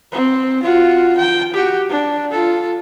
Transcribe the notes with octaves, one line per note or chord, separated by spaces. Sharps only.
C4
F4 F#4
G5
F#4 G4
D4
F4 A4